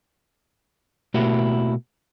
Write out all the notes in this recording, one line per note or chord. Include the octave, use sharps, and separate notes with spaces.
B2 A3 A#3 E4 F#4 G4